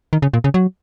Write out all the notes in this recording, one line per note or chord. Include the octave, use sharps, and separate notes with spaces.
D#3
C#3
A#2
C#3
F#3